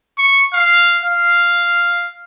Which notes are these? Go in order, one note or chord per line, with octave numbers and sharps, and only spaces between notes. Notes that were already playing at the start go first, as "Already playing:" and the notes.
C#6
F5
F5